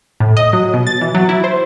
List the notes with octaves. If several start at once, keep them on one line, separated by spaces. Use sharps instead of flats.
A2
D#5
F#3
B2
A6
E3
F#3
E4
C5